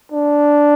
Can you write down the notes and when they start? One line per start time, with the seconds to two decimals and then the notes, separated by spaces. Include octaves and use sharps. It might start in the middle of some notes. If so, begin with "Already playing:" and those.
0.12 D4